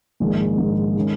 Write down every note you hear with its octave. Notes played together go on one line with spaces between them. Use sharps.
A#1 G#2 D#3 G#3
A#1 G#2 D#3 G#3
D#3 G#3 C#4